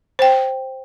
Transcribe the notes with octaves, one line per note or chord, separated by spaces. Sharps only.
C5 G5